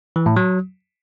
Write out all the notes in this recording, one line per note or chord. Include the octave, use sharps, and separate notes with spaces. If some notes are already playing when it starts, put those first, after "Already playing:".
E3
A2
F#3